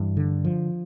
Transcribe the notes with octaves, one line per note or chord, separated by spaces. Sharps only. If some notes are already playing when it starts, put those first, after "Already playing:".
Already playing: G2 E3
D3
F3